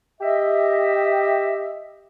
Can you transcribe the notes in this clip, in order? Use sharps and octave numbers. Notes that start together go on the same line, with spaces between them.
G4 D#5 E5